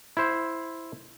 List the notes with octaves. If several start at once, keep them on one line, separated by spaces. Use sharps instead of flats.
E4 C5